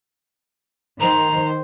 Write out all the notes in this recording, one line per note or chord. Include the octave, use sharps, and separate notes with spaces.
D#3 C5 A#5